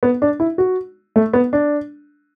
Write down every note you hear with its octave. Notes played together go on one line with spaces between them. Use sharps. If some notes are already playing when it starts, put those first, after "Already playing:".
B3
D4
E4
F#4
A3
B3
D4